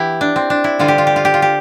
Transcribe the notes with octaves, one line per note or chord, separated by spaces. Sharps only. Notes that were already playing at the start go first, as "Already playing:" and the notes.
Already playing: E3 B3 E4 G4
D4
C4
D4
E4
D3 G3 C4 F4
G4
F4
G4
F4
G4
F4
G4